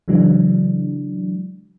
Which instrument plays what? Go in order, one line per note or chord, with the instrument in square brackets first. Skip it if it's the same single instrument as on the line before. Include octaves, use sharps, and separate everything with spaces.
[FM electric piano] C#3 E3 F#3 G#3 D4